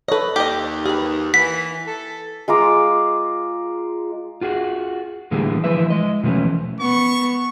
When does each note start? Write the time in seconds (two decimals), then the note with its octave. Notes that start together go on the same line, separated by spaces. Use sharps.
0.08 A4 B4 C#5 D#5
0.36 D#2 G4 D#5
0.86 G4 G#4 B4
1.34 E3 F#5 B6
1.87 A4
2.48 G#3 F4 A#5 D6
4.41 F4 F#4 G#4
5.31 A2 D3 E3 G3 A#3 G#4
5.64 E3 F3 E4 B4 E5
5.90 G#3 D#5
6.23 B2 E3 F3 A3 C#4
6.80 B3 C#6